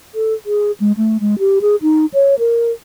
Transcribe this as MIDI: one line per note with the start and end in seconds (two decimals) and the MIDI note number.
0.15 0.34 69
0.46 0.72 68
0.80 0.92 56
0.97 1.17 57
1.20 1.39 56
1.39 1.59 67
1.61 1.76 68
1.82 2.06 63
2.13 2.35 73
2.39 2.71 70